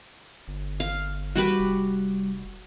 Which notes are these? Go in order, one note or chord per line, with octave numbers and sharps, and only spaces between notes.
G1
F5
G3 F#4 G4 B4
F1